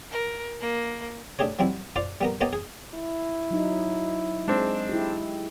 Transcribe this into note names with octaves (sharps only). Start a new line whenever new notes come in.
A#4
A#3
A3 D4 G4 G#4 C#5
F#3 G3 C4 E4
F4 C5 D5 F5
G3 B3 A#4
A#3 B3 G4 C#5 D#5 A5
G#4
E4
F#3 D#4
G#3 C4 D4
E4 G4